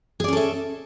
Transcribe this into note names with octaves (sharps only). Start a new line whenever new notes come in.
C#4 G#4 A4 D5 E5